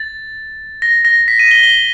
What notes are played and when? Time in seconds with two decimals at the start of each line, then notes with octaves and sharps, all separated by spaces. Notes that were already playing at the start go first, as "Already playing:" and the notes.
Already playing: A6
0.82 A#6
1.05 A#6
1.28 B6
1.39 D#7
1.51 G7
1.63 G7